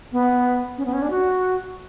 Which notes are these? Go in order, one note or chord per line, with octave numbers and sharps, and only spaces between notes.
B3
C#4
B3
C#4
D4
F#4